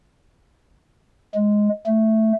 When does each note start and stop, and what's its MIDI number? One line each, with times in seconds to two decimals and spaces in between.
1.34 1.68 56
1.86 2.32 57